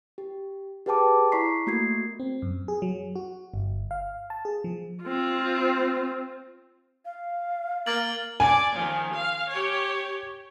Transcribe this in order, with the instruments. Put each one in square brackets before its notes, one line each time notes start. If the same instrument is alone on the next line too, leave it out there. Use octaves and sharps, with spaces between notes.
[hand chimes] G4
G4 G#4 B4 G5 A5 D6
E4 D5 A#5 C#6 B6 C7
A3 A#3 F#4 G#6 C7
[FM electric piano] C4
F#2
G#4
F#3
F#4
G1
F5
A5
G#4
F3
[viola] C4 F4
[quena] F5
[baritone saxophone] A#3 [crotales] F6 A6 F#7
[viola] D5 [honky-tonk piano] G#5
[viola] D#3 F3
F5
G4 C#5